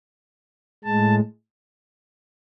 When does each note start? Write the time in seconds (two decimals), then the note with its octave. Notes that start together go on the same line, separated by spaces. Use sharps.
0.84 A2 G#3 A5